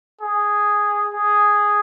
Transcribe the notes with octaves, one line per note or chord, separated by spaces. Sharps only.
G#4
G#4